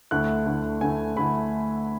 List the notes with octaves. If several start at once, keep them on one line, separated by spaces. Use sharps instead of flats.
D2 D3 A3 E4 F#6
D2 D3 A3 E4
D2 D3 A3 E4 G#5
D2 D3 A3 E4 B5